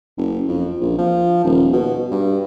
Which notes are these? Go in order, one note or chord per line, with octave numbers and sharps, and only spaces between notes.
F#1
F2
A#1
F3
D#1
B2
G2